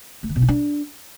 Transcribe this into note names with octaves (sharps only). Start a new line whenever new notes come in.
A3
D#3
B2
D#4
D4